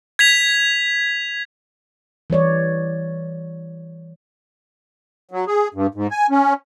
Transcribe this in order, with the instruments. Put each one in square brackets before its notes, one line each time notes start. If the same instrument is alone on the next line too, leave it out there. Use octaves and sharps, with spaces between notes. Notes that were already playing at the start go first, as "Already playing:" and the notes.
[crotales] G#6 B6 F7
[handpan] E3 G3 C#5 D5
[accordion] F#3
G#4
G2
G#2
G#5
C#4